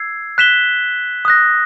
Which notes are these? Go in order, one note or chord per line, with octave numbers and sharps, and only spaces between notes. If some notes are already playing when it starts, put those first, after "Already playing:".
Already playing: E6 G#6 C7
F#6 B6 E7 G7
D#6 F#6 A#6